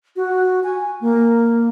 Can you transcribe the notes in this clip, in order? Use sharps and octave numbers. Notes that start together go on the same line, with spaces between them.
F#4
G#5
A#3